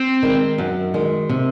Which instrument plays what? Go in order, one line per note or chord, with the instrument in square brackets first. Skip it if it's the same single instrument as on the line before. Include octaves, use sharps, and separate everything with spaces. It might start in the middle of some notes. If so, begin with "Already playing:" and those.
Already playing: [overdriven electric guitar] C4
[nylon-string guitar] D#3 G#3
F#2
D#3 G#3
C3